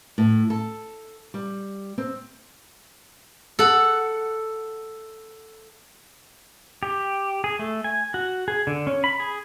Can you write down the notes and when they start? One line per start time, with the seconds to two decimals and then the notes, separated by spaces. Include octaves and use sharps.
0.18 A2
0.50 A4
1.34 G3
1.98 C4
3.59 A4 F#5
6.83 G4
7.44 G#4
7.59 A3
7.84 G#5
8.14 F#4
8.48 G#4
8.67 D3
8.87 C#4
9.04 B5
9.20 G#4